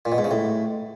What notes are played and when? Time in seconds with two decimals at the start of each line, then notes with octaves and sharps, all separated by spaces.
0.05 A#2
0.12 B2
0.18 G#2
0.24 C#3
0.31 A2